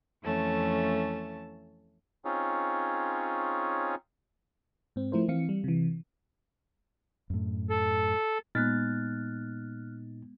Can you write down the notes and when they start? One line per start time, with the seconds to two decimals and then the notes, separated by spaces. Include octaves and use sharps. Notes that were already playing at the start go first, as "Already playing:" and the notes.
0.23 F2 E3 A3 C#4 A5
2.25 C4 C#4 D#4 F4 G#4 C#5
4.96 G#2 C4
5.12 F3 A3 E4 A#4 C5
5.28 E3 C4 F5 C#7
5.49 G3
5.64 C3 E3
7.30 F#2 A2
7.70 A4
8.55 A#2 G#3 B3 D#4 F6 F#6 A6